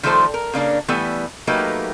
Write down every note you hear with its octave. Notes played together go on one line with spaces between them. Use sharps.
D#3 F3 G3 A3 A4 C5
A#4
C#3 A#3 D4
E3 G3 A3 B3
F#3 A3 A#3 D#4 G4 B4